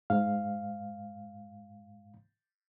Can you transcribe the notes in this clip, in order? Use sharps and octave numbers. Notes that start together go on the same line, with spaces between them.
G#2 F5